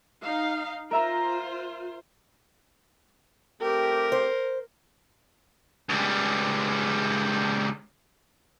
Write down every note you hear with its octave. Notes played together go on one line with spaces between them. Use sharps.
D#4 F5
F4 A#4 C5 E5 A#5
A3 C4 G4 A#4
C5
C#2 G3